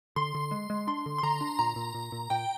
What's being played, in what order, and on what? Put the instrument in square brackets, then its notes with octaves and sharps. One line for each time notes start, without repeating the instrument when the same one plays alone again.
[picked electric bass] D3 [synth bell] C6
[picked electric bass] D3
G#3
G#3
[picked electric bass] D4 [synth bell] C6
[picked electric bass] D3
[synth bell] C6
[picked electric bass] D3 [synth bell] A#5
[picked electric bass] D4
[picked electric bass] A#2 [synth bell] A#5
[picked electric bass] A#2
A#2
A#2
[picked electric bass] A#2 [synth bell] G5